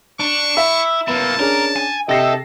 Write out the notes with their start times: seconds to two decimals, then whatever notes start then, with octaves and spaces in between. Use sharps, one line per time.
0.20 D4 C#6
0.57 E4 E5
1.08 A#3 B3 E4 A5
1.39 C#4 D4 G#4 A#4
1.76 G#5
2.09 C3 A4 D#5 E5 G5 A#6 C7